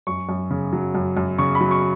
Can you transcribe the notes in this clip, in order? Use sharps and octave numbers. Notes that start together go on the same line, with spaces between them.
F#2 C#6
F#2
C#3
F#3
F#2
F#2
C#3 C#6
B5
F#3
C#6